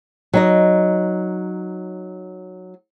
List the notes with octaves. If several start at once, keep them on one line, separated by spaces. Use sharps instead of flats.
F#3 D#4 D#5